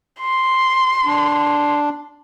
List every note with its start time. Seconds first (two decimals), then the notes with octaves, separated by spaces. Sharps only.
0.20 C6
1.05 D4